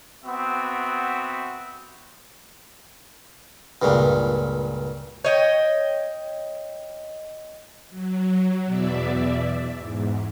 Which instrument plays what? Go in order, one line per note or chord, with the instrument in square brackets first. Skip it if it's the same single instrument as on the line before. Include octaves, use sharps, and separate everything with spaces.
[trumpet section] B3 C4 F#4 E5
[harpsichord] C#2 G2 A#2 C#3
[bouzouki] C#5 D#5 G5
[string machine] F#3
E2 B2 D5 E5
E2 G#2